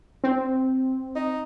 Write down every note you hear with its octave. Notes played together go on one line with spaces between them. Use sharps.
C4
D#4